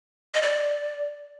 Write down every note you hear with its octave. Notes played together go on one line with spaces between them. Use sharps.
D#5
D5